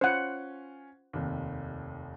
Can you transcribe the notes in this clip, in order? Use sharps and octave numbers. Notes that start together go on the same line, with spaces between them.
C#4 F4 C5 F#5
F1 D#2